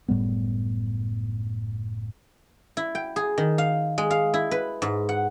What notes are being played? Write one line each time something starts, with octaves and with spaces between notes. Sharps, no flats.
F#1 A2 G3 B3
E4
G5
G#4
D#3
F5
G#3
F5
E4
B4
G#2
F#5